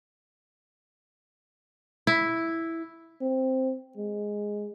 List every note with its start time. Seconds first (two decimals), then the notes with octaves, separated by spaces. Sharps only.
2.07 E4
3.21 C4
3.97 G#3